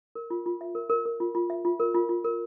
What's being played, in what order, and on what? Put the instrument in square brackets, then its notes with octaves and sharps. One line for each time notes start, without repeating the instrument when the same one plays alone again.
[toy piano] A#4
F4
F4
E5
A#4
A#4
A#4
F4
F4
E5
F4
A#4
F4
F4
A#4